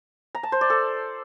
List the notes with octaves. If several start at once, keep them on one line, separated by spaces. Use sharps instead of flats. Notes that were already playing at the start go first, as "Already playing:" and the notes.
A#5
A5
C5
D5
A4